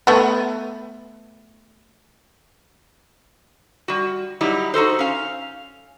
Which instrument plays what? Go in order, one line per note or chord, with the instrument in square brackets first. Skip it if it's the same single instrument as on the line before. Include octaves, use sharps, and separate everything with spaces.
[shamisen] A3 B3
[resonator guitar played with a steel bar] G3 F#4
F#3 G3 D#4 E4 G4
D#4 F#4 A4 C5
C#4 F5